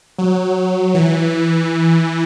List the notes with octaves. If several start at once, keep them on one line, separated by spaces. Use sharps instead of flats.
F#3
E3